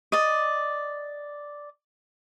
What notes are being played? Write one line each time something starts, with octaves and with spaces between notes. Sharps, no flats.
D5 D#5